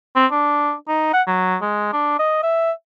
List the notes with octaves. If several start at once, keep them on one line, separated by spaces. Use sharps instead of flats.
C4
D4
D#4
F#5
F#3
G#3
D4
D#5
E5